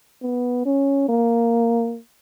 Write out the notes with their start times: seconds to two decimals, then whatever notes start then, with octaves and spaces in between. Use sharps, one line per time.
0.22 B3
0.65 C#4
1.08 A#3